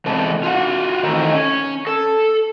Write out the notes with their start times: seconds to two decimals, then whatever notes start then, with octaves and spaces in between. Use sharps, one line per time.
0.06 E2 C3 G#3 A4
0.43 F4 F#4 F#5
1.03 D#3 E3 A3 C4 A#5
1.34 C#4
1.87 A4